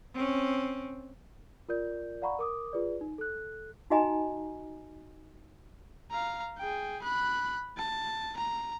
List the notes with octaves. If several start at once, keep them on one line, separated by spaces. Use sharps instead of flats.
C4 C#4
F4 A#4 D5 G6
D5 F5 F#5 A#5 B5 C#6
A#4 D6 D#6
F4 G#4 B4 D5
D#4
A4 F#6
D#4 F#4 D#5 G#5 A#5
F5 A#5
G#4 G5
B5 F#6
A5
A#5